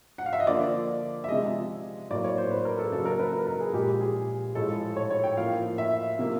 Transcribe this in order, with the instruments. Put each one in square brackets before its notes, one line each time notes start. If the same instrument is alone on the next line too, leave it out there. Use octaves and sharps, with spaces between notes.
[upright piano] F#5
F5
E5
D#5
D3 F3 A#3 D5
E5
C3 F3 G#3 D#5
A2 F#3 A#3 D5
C#5
C5
B4
A#4
A4
C#3 F#3 A#3 A4
A#4
B4
A#4
A#4
G#4
A#2 F3 G#3 G4
G#4
A2 F3 G#3 A4
C#5
C#5
G5
A2 F3 A#3 F5
E5
C3 F3 A#3